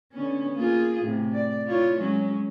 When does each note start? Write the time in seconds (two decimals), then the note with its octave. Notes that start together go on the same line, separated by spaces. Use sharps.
0.12 D3 B3 C#4
0.55 A#3 F4 G#4
1.02 A2 C3
1.33 D5
1.66 E4 F4 C#5
1.99 F#3 G#3 C#4